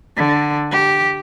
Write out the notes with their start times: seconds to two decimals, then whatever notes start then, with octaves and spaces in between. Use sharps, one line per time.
0.17 D3
0.71 G4